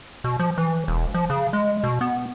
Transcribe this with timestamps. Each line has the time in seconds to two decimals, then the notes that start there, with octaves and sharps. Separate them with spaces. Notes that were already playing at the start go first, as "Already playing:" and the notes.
0.24 B2
0.39 F3
0.58 E3
0.88 E1
1.14 F3
1.30 C#3
1.53 G#3
1.83 B2
2.01 B3